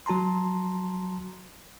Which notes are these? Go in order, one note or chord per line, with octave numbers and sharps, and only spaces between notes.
F#3 F#4 A5 A#5 C6